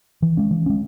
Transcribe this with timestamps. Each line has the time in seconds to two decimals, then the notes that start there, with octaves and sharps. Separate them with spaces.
0.22 E3
0.37 G#3 C#4
0.51 E3
0.66 G#3 C#4